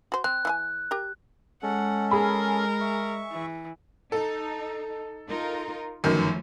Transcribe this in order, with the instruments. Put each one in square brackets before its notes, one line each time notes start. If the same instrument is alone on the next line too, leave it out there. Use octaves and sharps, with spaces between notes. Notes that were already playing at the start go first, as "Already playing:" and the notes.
[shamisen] F#4 C5
[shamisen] C4 [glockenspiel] F#6
[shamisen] E3 E4 G#5
G4 A#4
[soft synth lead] G#3 [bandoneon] C#4 A4 [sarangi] F#5
[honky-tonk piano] G#4 G#5 B5 [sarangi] A#4
[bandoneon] E5 C#6
[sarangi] E3
[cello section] D#4 [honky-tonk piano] A4
[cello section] D#4 F4 A#4
[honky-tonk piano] G1 F#2 D#3 [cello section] F3 A3